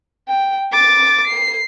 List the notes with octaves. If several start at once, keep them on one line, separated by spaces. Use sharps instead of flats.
G5
D6 A6
C7